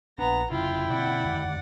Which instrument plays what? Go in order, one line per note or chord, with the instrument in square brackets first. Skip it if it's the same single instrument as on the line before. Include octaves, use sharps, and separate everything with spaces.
[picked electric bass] A#1 D4 [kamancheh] B3 [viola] A#5
[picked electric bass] F1 C#3 [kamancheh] E4 G5 [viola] F4
[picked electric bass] B2 D3 C4 [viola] D5 F#5
[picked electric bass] F2 D3 D#3